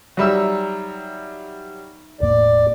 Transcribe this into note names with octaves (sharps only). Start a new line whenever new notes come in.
F#3 G3 D#4 E5 E6
E1 A2 A#3 D5